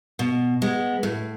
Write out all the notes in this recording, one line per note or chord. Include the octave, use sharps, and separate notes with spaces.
B2
G#3 B3
A2